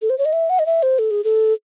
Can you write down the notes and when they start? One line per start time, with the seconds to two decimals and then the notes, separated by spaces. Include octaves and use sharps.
0.02 A4
0.10 C5
0.18 C#5
0.25 D#5
0.33 E5
0.50 F#5
0.59 D#5
0.66 E5
0.83 C5
0.99 A4
1.11 G#4
1.24 A4